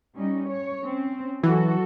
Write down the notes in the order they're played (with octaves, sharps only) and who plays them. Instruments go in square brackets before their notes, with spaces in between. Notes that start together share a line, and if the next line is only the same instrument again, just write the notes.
[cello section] G3 C#4 D#4
C#5
C4 C#4
[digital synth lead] E3 [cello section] F#3 F#4 A4